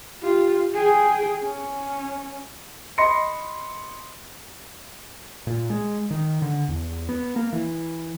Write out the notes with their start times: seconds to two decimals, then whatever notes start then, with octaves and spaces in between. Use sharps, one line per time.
0.22 F4 G4
0.73 G#4 G5
1.41 C#4
2.98 D#5 B5 C6 A#6 C#7
5.47 A#2
5.70 G#3
6.11 D#3
6.42 D3
6.68 E2
7.09 B3
7.36 A#3
7.53 E3